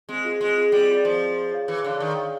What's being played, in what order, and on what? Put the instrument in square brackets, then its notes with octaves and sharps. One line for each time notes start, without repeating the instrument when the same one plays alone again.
[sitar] G#3 [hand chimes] C4
[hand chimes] F4 G#4
[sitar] G#3 [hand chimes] C4
[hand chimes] F4 G#4
[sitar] G3 [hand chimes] C4
[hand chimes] F4 G#4
[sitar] F3 [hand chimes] C4
[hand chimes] F4 G#4
G#4
C#5 F5
[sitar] E3 [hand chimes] G#4
[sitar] D3 [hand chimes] C#5 F5
[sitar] D#3 [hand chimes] G#4
[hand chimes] C#5 F5